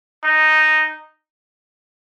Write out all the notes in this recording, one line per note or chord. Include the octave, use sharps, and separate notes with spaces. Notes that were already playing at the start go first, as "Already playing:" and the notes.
D#4